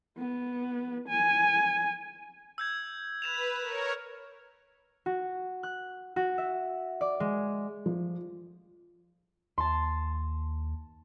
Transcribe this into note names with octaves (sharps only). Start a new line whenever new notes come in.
B3
G#5
E6 G6 G#6
B4 G#6 E7 F7
A#4 C#5
F#4
F#6
F#4
E5
D5
G#3
F3
D#2 A5 C6